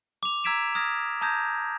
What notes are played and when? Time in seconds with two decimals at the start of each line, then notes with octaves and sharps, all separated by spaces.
0.23 D6 F7
0.44 A#5 E6 G#6 B6 D7 E7
0.75 D#6 F6 G#6 A#6
1.21 A5 A#5 D#6 G6 G#6 A#6